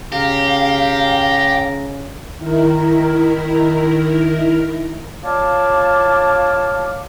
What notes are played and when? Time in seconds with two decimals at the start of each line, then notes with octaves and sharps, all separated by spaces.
0.12 C#3 G4 F5 A#5
2.38 D#3 E4 A#4
5.24 F4 C#5 D5 F5 A5 D6